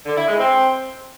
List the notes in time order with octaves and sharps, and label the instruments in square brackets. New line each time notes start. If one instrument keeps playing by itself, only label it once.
[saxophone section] D3
E4
G#3
C4